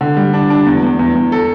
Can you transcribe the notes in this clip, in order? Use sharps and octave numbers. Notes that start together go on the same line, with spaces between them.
D3
G3
D4
D4
E2
E2
E2
E2
A4